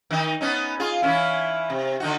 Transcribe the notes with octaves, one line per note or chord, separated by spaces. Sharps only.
D#3 D#4
B3 C#4 D#4
F4 G#4
E3 C#4 E4
C3
D3 D#4 F#4